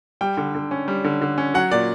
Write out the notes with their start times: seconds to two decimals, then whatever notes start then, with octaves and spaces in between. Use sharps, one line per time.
0.21 G3 G5
0.37 D3
0.55 D3
0.71 C#4
0.88 G3
1.04 D3
1.22 D3
1.38 C#4
1.54 F#3 F#5
1.71 A#2 D5